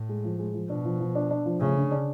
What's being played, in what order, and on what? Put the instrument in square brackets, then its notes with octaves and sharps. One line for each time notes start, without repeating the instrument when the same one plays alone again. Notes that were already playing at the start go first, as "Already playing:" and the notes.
Already playing: [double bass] A2
[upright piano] G#3
F3
G#3
F3
[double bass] B2 [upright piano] D4
[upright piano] F3
F3
D4
D4
F3
[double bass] C#3 [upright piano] A3
[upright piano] D3
D4